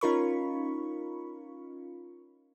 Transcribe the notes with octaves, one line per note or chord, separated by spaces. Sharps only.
C#4 D#4 F4 A#4 B5 C#6